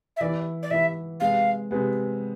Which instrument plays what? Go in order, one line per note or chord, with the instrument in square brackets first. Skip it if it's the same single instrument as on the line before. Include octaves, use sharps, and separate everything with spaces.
[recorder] E5
[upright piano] E3 B3 E4 [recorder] D5
[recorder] D5
[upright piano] E3 B3 E4 [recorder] E5
[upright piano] C3 G#3 B3 [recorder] F5
[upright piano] C3 G#3 B3